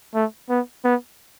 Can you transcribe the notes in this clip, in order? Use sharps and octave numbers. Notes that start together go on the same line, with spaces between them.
A3
B3
B3